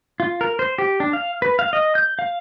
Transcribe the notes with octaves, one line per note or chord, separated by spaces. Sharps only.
F4
A#4
C5
G4
D4
F5
B4
F5
D#5
G6
F5